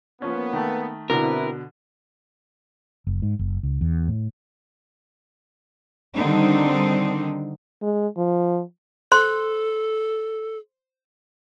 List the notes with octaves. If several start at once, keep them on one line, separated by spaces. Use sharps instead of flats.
F3 A#3 B3 C#4
D#3 A3
B2 D3 C4 E4 A#4 B4
F#1
G#2
F#1
C#2
E2
A2
D3 D#3 G3 C4 D4 D#4
G#3
F3
A4 C5 C6